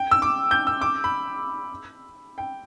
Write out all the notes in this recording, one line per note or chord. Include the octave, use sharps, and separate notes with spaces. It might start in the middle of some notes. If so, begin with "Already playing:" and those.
Already playing: G5
E6
D6
G6
E6
D6
B5
G5